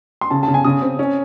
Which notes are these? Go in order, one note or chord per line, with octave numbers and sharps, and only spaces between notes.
C6
C#3 A5
A5
C#3
G#5
C#3 D#6
C4
C#4